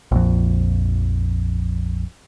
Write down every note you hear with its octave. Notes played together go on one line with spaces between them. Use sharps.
A#1 F2